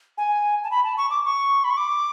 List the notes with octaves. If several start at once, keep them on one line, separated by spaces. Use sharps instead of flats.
G#5
A5
B5
A5
C#6
D6
C#6
B5
C#6
D6